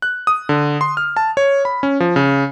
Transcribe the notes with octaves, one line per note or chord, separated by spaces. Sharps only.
F#6
D#6
D3
C6
F6
A5
C#5
B5
C#4
F3
C#3